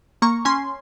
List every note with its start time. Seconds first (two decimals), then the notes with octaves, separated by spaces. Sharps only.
0.22 A#3 A#5 C#6
0.45 C#4 G#5 C6